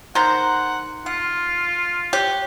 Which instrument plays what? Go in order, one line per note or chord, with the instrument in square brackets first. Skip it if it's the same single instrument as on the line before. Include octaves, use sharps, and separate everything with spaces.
[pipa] D#3 C5 [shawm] F#5 [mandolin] A#5
[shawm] F4 [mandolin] F#5
[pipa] G4 [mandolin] C#5 F#6